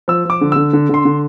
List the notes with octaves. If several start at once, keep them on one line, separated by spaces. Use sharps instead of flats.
F3 E6
F3 D6
D3
D3 E6
D3
D3 C6
D3